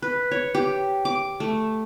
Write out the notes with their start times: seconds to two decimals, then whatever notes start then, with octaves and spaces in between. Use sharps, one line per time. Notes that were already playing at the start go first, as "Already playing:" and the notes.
0.02 B4
0.31 C#5
0.55 G4
1.05 D6
1.40 A3